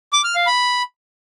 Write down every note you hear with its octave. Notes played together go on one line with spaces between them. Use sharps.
D6
F6
F5
B5